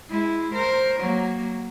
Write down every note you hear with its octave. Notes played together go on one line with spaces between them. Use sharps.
G#3 E4
A#4 C5
F#3 A#3